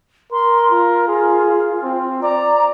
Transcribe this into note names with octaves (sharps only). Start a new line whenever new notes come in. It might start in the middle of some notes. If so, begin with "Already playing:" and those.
A#4 C6
F4
G#4
C4
D5 A#5